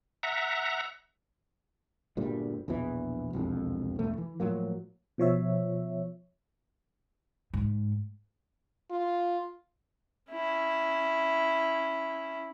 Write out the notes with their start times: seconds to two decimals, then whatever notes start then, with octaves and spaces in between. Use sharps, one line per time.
0.23 E5 F#5 A#5
2.17 G1 D2 A#2 G3
2.68 A#1 E2 B2 E3
3.33 E1 C2 F2
3.99 E1 A1 E2 A3
4.18 E3
4.40 A2 F3 F#3 A#3
5.18 B2 F3 C#5 E5
7.54 G#2
8.91 F4
10.31 C#4 E4